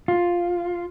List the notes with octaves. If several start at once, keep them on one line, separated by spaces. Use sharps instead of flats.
F4